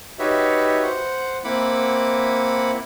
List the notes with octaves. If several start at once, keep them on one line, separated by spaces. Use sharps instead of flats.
D#4 F#4 G4 B4 C#5 E5
C5 F#5
A#3 C4 E4 F#5 B5 D6